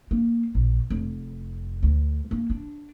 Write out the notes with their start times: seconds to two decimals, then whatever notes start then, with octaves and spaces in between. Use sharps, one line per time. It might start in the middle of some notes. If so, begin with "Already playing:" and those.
0.11 A#3
0.55 A#1
0.90 F1
1.83 D2
2.31 A#3
2.50 D4